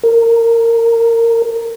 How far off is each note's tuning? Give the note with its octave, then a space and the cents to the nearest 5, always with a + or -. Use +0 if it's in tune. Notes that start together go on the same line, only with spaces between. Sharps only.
A#4 -20